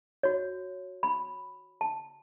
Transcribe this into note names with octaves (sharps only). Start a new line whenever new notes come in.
F#4 C#5
B5
A5